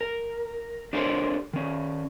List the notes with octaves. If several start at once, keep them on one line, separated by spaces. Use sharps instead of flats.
A#4
D4 G4 A4 A#4 C5 C#5
D#3 C#4